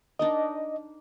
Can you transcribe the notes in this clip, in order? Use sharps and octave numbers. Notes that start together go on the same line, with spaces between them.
D4 D#4 A#4 D#5